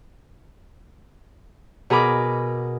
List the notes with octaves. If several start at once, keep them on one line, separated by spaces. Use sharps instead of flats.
B2 G#4 A#4 B5 D6